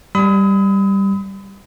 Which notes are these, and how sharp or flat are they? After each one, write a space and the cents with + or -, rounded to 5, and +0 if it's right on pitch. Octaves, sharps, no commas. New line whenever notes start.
G3 +0 B5 +35 D#6 +35